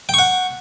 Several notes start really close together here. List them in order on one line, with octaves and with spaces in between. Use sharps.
G5 C#6 F#5